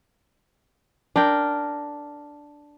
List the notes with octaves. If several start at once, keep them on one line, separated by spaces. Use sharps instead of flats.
D4 A#4 G5